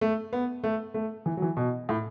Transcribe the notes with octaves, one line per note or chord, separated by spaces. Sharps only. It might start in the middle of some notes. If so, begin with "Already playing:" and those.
A3
B3
A3
A3
E3
F#3
E3
B2
A2